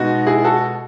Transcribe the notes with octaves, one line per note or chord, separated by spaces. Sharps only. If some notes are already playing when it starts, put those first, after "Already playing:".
Already playing: B2 G#3 B3 D#4 F#4
E4 G#4
F#4 A4